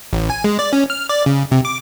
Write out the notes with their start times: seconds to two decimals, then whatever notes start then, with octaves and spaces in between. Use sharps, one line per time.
0.13 A1
0.30 G#5
0.44 G#3
0.59 D5
0.73 C#4
0.90 F6
1.09 D5
1.26 C#3
1.52 C3
1.65 D6